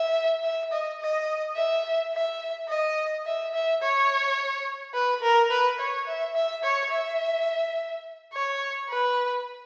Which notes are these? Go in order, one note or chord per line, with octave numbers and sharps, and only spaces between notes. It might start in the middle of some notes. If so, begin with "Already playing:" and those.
Already playing: E5
E5
D#5
D#5
E5
E5
D#5
E5
E5
C#5
B4
A#4
B4
C#5
E5
E5
C#5
E5
C#5
B4